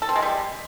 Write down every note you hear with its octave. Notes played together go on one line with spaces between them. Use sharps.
A4
C4
G#3
G3